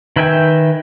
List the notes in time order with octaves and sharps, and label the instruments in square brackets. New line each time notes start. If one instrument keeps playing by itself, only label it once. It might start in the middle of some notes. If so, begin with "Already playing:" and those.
[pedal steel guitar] D#3 B4 E5 G5 G#5